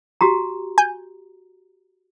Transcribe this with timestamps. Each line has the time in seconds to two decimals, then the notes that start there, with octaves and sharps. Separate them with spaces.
0.21 F#4 G4 A#5
0.78 G#5 G6